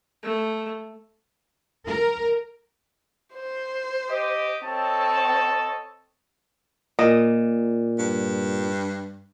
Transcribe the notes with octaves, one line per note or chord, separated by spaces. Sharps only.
A3
A#4
C5
G4 D#5
C4 A4 C#5 D#5 A5
A#2 D#5
G2